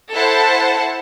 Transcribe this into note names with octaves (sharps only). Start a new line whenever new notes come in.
E4 A4 C5 F#5 A5